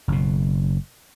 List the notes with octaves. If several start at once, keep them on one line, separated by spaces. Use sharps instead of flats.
F#1 B2